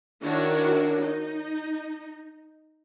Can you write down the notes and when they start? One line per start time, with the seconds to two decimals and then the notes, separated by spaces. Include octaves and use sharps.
0.22 D#3 D4 E4 F#4 A#4 C#5
1.01 D#4